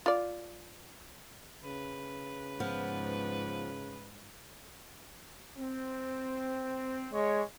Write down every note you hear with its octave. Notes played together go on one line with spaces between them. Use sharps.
F4 D5
C#3 B4
G#2 F3 B3
C4
G#3 C#5